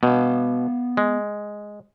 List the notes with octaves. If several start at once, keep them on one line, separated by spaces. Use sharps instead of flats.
B2 B3 F5
G#3